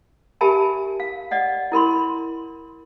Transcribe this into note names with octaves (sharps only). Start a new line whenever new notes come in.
G4 A#4 E5 G#5 A5 B5
F5
D5 D#5 F#5
E4 A#4 B5 C6